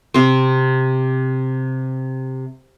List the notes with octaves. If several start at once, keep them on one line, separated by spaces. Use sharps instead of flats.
C3 C4